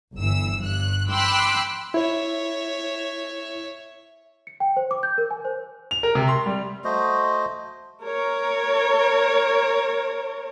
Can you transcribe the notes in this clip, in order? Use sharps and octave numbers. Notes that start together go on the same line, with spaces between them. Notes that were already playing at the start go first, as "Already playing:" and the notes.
G1 E3 E6
G2 F#6
G5 B5 C6 D6 E6 F#6
E4 C#5 E5
C#7
G5
C5
D6
G6
A#4
G#5
C5
F7
A#4
C3
C6
G3
A3 F#4 C5 D#5
A#4 C#5